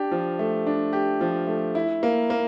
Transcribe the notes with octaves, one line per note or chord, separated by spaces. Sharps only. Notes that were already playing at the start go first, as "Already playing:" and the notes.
Already playing: D4 G4
F3
A3
D4
G4
F3
A3
E4
A#3
A#3